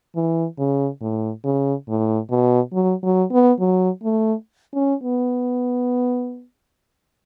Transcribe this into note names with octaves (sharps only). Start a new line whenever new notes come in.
E3
C#3
A2
C#3
A2
B2
F#3
F#3
B3
F#3
A3
C#4
B3